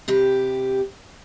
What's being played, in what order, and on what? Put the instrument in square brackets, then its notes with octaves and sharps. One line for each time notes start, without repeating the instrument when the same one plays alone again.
[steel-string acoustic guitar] C3 G4 B4